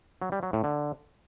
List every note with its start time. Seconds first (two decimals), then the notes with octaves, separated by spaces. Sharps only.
0.22 F#3
0.32 G3
0.43 F#3
0.53 A2
0.64 D3